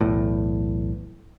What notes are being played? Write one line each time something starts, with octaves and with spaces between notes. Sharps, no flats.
B1 E2 A2